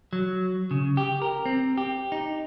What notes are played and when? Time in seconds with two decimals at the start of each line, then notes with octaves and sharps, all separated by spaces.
0.13 F#3
0.71 C#3
0.97 G4
1.22 A#4
1.46 C4
1.77 G4
2.12 D#4